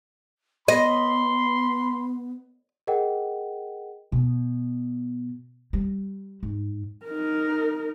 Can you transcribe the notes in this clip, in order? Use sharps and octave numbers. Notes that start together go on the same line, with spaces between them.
B3 D#5 B5 C6
G#4 A#4 D#5 F#5 G5
B2
G3
G#2
D#4 A#4